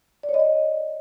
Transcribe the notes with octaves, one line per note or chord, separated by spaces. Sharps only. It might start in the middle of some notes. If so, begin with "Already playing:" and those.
D5
C#5
D#5
D5